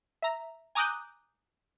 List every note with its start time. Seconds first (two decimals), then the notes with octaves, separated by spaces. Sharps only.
0.22 E5 A#5
0.75 G#5 A#5 D6 D#6 F#6 G6